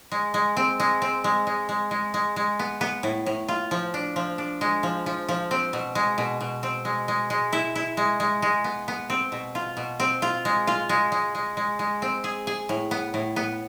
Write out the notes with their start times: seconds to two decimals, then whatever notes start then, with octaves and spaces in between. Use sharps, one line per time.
0.12 G#3
0.34 G#3
0.57 C4
0.80 G#3
1.02 C4
1.24 G#3
1.47 G#3
1.69 G#3
1.91 G#3
2.14 G#3
2.36 G#3
2.59 B3
2.81 B3
3.03 A2
3.26 A2
3.48 F4
3.71 F3
3.94 D4
4.16 F3
4.38 D4
4.61 G#3
4.83 F3
5.06 F3
5.29 F3
5.51 C4
5.73 B2
5.95 G#3
6.18 B2
6.40 B2
6.63 C4
6.85 G#3
7.08 G#3
7.30 G#3
7.53 E4
7.75 E4
7.97 G#3
8.20 G#3
8.42 G#3
8.64 B3
8.88 B3
9.10 C4
9.32 B2
9.55 F4
9.77 B2
10.00 C4
10.22 F4
10.45 G#3
10.67 F4
10.89 G#3
11.12 G#3
11.35 G#3
11.57 G#3
11.79 G#3
12.02 C4
12.24 G#4
12.47 G#4
12.69 A2
12.91 B3
13.14 A2
13.36 B3